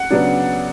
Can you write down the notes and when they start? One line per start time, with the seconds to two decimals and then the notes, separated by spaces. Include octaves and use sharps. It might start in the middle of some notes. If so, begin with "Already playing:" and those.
Already playing: F#5
0.11 C#3 F#3 B3 D4